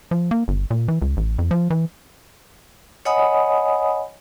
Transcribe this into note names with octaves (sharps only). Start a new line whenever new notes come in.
F3
A#3
G1
A#2
E3
C#2
A1
F2
F3
E3
C#5 D#5 F#5 G#5 B5 D#6